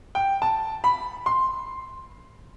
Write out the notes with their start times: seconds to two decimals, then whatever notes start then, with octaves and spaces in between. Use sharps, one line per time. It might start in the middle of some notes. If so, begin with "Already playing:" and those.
0.15 G5
0.42 A5
0.84 B5
1.26 C6